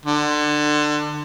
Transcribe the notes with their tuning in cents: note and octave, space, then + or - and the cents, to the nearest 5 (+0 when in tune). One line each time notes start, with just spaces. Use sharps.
D3 +25